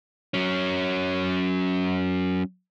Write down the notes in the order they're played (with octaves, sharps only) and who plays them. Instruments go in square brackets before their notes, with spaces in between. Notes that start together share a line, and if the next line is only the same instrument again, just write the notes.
[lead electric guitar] F#3 C#4